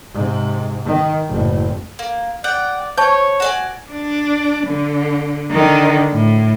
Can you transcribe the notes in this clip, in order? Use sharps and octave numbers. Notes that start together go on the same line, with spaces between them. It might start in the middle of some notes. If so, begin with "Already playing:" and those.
G#2 C3
D#3
F#1 A2
A#3
D5 F#5 G5
C5 C#5 A5 C#6 G6
F#4 D5 G#5
D4
D3
D3 D#3
A2